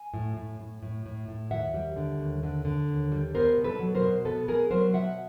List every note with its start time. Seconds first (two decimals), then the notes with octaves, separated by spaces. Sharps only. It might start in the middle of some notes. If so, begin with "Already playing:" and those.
Already playing: G#5
0.14 A2
0.37 A2
0.60 A2
0.83 A2
1.06 A2
1.28 A2
1.51 D#2 E5 F#5
1.74 G3
1.96 D3
2.19 D#2
2.43 D3
2.65 D3
2.89 D#2
3.12 G3
3.35 B3 A#4 C5
3.57 B2
3.64 A4 B4
3.79 F#3
3.95 A#4 C5
4.02 B2
4.25 B3 A4 B4
4.48 B2 G#4 A#4
4.70 F#3 A#4 C5
4.93 B2 E5 F#5